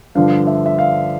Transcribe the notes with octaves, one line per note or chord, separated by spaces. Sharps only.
G2 D3 F3 F5
E5
E5
F5